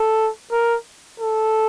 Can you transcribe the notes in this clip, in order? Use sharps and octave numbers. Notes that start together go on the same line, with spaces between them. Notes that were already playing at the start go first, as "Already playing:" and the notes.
Already playing: A4
A#4
A4